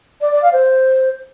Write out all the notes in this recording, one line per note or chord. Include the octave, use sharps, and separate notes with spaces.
D5
D5
F5
C5